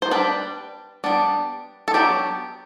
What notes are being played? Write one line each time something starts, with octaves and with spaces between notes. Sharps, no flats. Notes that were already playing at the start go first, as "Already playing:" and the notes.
C5
G3 D4 B4
G3 B3 D4
A4
F#3 B3 D4 G4